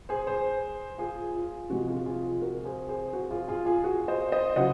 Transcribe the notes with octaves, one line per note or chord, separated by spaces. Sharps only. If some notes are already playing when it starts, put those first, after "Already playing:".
G#4 C5
G#4 C5
F4 G#4
F4
C3 F3 G#3 F#4
F4 G#4
F4 G#4
F#4 A#4
G#4 C5
G#4 C5
F#4
F4 G#4
F4 G#4
F4 G#4
F#4
C5 D#5
C5 D#5
C#3 F#3 D#5 F#5